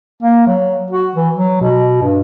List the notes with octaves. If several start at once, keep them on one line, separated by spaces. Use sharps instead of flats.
A#3
F#3
F#4
E3
F#3
B2
G2